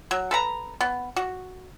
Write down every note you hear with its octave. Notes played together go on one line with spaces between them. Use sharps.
F#3
A4 B4 A#5
B3
F#4